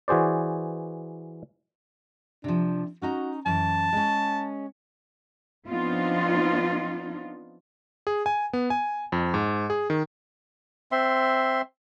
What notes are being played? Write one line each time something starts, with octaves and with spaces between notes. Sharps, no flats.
E3 F#4 G#4 C5 D5
C3 F3 D4
C#4 D#4 F#4 A#5
F#2 E3 A5
G#3 C#4
F3 B3 C4 D4 D#4 F4
G#4
G#5
B3
G#5
F2
G#2
G#4
D#3
C4 E5 C6